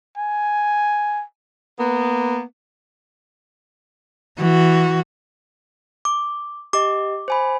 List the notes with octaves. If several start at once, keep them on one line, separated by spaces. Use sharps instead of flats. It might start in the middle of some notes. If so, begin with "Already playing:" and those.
G#5
A#3 B3
E3 F#4
D6
G4 D#5 D6
C5 G#5 B5